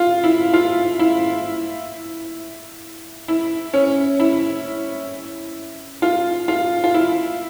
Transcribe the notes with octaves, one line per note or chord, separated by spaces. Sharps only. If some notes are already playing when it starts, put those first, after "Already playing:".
Already playing: F4
E4
F4
E4
E4
C#4
E4
F4
F4
F4
E4